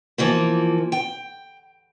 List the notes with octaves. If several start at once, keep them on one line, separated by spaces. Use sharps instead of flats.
E3 F3 A#3
G5